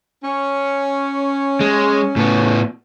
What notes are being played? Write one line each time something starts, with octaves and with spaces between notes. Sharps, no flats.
C#4
G#3
A2 B3